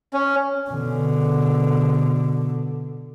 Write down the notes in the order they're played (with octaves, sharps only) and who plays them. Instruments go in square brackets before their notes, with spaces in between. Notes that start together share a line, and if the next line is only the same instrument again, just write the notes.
[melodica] C#4
[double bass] B2 D3